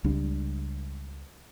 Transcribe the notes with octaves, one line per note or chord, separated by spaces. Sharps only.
C#2 G3 D4